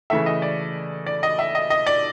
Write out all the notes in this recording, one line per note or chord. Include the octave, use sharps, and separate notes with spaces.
C#3 E3 A3 E5
D#5
D5
D5
D#5
E5
D#5
D#5
D5